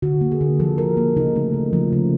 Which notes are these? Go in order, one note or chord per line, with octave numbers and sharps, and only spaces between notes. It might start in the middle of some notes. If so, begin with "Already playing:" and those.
D3 F#4
A#3
G#4
D3
F3 A4
D3 A#4
A#3
C#3 D#4
A3
C#3
F3
C#3